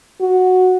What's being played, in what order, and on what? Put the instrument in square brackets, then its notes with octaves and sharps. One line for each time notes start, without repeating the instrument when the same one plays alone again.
[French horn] F#4